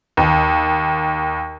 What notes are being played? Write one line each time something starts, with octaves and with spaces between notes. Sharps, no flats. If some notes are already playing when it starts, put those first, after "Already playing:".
D#2